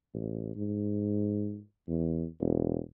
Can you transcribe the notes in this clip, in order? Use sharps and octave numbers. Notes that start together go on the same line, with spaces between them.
A1
G#2
E2
E1